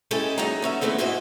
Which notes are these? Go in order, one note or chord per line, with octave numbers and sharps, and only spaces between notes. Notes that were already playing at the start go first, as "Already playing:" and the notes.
G#3 C#4 E4 G4 A4
F#3 D#4 G#4 A#5
B3 C#4 E5
E3 F3 G#3 A3 B3 C4
D#2 G#2 E4 F#4 C5 D#5